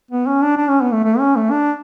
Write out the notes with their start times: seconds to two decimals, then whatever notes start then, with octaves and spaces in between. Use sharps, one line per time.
0.11 B3
0.27 C#4
0.42 D4
0.57 D4
0.69 C#4
0.81 B3
0.92 A3
1.04 A3
1.19 C#4
1.36 A3
1.51 D4